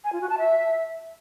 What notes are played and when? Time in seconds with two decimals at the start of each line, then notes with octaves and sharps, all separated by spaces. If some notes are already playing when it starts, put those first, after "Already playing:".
0.04 G#5
0.13 F4
0.21 F#4
0.30 A5
0.38 E5